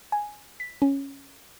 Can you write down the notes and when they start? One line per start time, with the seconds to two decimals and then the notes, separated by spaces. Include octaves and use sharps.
0.12 G#5
0.60 B6
0.82 C#4